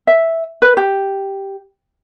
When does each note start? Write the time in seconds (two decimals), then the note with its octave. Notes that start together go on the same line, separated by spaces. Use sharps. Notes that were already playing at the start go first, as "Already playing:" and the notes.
0.07 E5
0.62 B4
0.77 G4